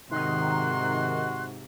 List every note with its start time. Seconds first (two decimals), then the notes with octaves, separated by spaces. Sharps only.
0.11 G#2 C3 D#3 D#4 F#4 C6 F#6